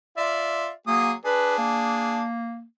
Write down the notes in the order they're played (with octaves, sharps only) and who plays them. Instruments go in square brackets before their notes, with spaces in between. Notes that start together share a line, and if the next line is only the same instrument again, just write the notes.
[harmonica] F4 D5 [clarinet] E5
[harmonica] F#3 G#4 D#6 [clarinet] A#3
[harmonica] D4 G#4 [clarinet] B4
[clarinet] A#3